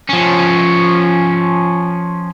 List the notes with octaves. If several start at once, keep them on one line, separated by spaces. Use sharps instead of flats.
F3 C#4